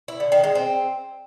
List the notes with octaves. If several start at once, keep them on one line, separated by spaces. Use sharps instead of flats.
E4
D3
D#3
G#3
C4